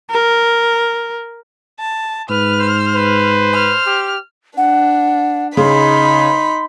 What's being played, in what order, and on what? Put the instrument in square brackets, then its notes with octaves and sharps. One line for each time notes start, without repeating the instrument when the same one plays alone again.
[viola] A#4
[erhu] A5
[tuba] G#2 [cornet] B4 [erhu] F6
[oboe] C5
[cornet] B4
[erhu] F6
[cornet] G4
[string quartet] D4 [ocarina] F#5
[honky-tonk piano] C#3 [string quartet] D#4 B5 [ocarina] C6